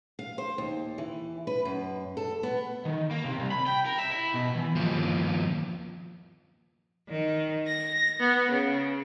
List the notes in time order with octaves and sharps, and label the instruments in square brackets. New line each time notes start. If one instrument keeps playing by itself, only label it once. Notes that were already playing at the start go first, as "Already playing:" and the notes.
[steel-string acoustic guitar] F5
C5
D#2
E3
B4
F#2
A4
B3
[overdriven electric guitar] D#3
A#3
C3
C2
B5
G5
A#4
E5
E4
B2
E3
[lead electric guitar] D#2 F3
[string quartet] D#3
A#6
B3
C#3